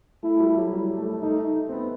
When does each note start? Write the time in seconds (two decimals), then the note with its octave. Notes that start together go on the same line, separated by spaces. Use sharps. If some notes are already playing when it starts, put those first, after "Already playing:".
0.23 A3 E4
0.36 A3
0.40 G3
0.57 F#3
0.73 G3
0.98 A3
1.22 A3 D#4
1.69 C4
1.72 B3